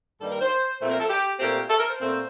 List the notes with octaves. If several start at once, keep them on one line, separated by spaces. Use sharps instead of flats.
G2 D#3 G3 A#3 A4
A#4
C5
A#2 F3 A3 C4 C5
A#4
A4
G4
A#2 A3 C4 G4
A4
A#4
C5
A#2 A3 C4